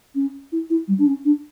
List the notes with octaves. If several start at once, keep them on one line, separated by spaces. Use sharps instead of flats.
C#4
E4
E4
G3
D4
C#4
D4